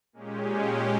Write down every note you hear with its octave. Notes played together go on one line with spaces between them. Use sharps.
A#2 G#3 C#4 G4